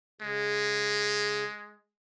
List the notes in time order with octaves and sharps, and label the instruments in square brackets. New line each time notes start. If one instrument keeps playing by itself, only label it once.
[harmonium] C#3 [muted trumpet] G#3